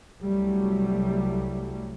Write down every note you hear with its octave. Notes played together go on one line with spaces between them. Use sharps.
C2 F#3 G3 A3